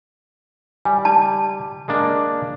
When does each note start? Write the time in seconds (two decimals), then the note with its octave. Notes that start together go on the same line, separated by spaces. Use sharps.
0.85 G3 G#5
1.05 A5
1.88 G#3 A#3 D4